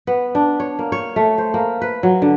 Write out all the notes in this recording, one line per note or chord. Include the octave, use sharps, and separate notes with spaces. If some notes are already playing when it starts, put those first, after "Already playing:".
B3
D4
C#5
A#3
C#5
A3
C5
A#3
B4
F#3
D3